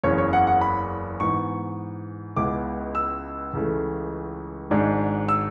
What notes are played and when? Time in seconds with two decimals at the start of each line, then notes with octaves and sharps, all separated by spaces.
0.03 F#1 E2 C#3 E3 C#5
0.18 C#5
0.33 F#5
0.47 F#5
0.61 B5
1.20 G#2 E3 B3 C#6
2.36 C#2 C#3 G#3 B3 E4 D6
2.95 E6
3.53 C#2 C#3 E3 A3
4.70 G#1 G#2 G#3 D4
5.29 E6